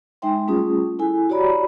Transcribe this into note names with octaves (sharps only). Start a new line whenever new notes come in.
G#3 D#4 E5 G5 C6
G3 A3 C#4 F4 G#4 D#6
E4 A4 G#5
F#4 G4 C#5 D5 A#5 B5